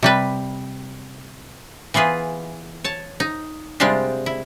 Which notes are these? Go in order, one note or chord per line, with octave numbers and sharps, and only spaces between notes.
C3 G3 B4
E3 B3 F4 G#4 B4
C#5 A5
D#4
C3 G3 G#3 D4 F4 G4
E4